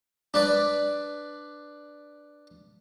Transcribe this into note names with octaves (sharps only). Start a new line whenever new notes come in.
D4 B4 D5